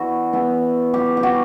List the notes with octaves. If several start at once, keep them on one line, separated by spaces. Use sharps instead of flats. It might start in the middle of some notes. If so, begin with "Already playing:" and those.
Already playing: E3 B3 D4 E4 F#4
E3 B3 E4
G4
G4
F#4